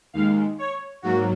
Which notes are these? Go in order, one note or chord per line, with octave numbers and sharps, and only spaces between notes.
D#2 D#3 G#3 F5
C#5
G#2 F#3 A#3 F#4